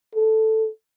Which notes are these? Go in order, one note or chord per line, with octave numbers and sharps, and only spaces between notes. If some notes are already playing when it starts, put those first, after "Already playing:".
A4